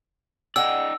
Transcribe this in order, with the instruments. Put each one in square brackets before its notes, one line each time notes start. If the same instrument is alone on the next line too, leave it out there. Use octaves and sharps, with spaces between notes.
[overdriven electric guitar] D#4 D5 [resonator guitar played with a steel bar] G#4 F#5 [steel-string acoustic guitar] G5 [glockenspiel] E6